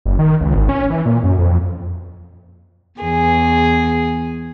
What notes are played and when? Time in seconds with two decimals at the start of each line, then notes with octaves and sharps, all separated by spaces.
0.06 F#1
0.19 D#3
0.41 C#2
0.54 G#1
0.69 C#4
0.90 E3
1.06 A#2
1.24 F#2
1.38 F2
3.01 E2 G#4